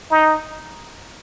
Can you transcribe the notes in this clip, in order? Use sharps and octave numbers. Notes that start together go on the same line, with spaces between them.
D#4